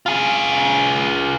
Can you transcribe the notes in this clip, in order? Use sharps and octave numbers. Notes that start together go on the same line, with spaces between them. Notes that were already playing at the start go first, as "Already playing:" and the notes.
F4 G#4